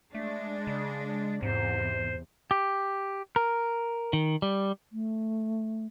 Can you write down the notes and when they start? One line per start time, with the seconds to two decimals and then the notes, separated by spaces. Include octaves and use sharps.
0.14 G#3 A3 D4
0.67 C#3
1.43 E2 G#2 C3 C5
2.51 G4
3.36 A#4
4.13 D#3
4.42 G3
4.92 A3